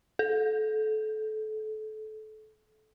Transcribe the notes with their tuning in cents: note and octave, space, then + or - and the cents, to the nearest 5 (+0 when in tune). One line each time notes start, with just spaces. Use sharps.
A4 -25